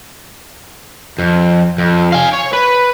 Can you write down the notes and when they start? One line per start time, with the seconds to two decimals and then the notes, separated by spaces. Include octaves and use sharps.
1.19 F2
1.79 F2
2.13 F5 G#5
2.33 C#5
2.53 B4